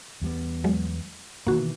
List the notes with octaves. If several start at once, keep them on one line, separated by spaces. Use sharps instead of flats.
E2 G3 B3
F#3 G#3
B2 D#3 E3 A#3 F#4